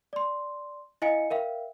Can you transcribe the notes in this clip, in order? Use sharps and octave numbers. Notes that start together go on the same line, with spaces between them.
D5 C6
E4 D#5 F5 G#5 C#7
A#4 E5 F5 G5